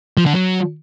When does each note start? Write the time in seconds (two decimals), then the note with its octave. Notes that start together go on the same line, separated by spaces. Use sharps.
0.17 F3
0.26 D3
0.35 F#3